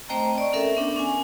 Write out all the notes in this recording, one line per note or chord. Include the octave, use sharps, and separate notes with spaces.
A3 C4 C5 D#5 G5 A#5
D5 C#6
C#4 A4 A#4 E5
B3 D4
C#4 G#5